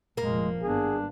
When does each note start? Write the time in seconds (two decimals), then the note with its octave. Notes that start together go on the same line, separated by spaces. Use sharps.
0.17 F1 A#2 F3 G#3 A#3
0.62 G#1 G2 B3 D4 G#4